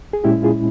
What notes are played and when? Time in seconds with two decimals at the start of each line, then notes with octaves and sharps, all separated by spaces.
0.13 G#4
0.24 A#2 G#3 C#4 E4 G4
0.43 F4 G#4